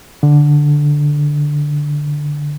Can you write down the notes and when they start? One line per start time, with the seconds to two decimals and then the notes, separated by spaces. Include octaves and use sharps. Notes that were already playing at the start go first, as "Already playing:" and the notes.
0.23 D3